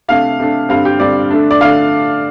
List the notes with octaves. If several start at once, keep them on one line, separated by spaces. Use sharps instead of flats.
C3 A3 D4 F5
C3 A3 D4
G2 D3 G3 C4 F5
G4
G2 D3 G3 C4 D5
D3 A3 D4
D5
D3 A3 D4 F5